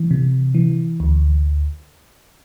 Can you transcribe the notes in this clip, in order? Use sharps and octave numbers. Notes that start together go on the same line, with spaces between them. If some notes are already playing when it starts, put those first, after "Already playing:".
Already playing: E3
C3
E3
D2